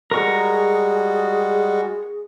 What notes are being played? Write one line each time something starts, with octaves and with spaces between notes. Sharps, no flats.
G3 G#3 F#4 G#4 A#4 C#6